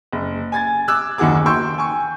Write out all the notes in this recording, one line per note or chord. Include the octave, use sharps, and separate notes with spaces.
F#1
G#5 G#6 A6
D6 E6 F#6
F#1 D#2 D#3 F#4 G#4 D6
G5 C6 C#6 E6 G6
G#5 C#6